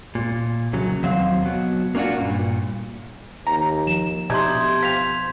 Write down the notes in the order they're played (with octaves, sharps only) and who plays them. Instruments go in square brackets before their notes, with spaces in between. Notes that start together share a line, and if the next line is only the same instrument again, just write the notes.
[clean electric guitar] A#2
C2 C#3 F#3
D#2 F#3 C4 F5
B2 F#3
A#3 C#4 D4 F4 F#4
G2 A#2
[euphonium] D#2 [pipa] A#5
[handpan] F3 [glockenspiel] E7
[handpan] B2 [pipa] A3 D4 D#4 [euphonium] G4 [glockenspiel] C6 G6 G#6
[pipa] C4 F4 [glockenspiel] B6 F7